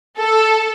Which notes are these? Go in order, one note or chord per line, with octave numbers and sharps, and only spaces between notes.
A4